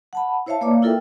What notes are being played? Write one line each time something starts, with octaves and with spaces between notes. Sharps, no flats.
F#5 A5 B5
E4 C5 C#5 E5 F5 A5
A#3 B4 C#5 D5 F5 D6
E4 F4 A4 A#4 E5 G5